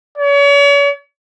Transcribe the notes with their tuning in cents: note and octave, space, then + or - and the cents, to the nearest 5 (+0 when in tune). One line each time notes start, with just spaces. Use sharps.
C#5 +40